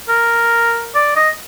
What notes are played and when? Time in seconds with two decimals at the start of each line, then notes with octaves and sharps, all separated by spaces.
0.09 A#4
0.95 D5
1.16 D#5